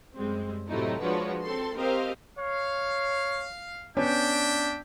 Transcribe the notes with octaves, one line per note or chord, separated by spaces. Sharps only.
F#2 G3 G#3 C4
A2 C3 F#3 A3 D#4 E4
F3 G#3 D4 F#4 B4 C#5
C4 A4 C6
C4 G4 A#4 C5 D#5 F5
C#5 F5
B3 C#4 D4 E5 G5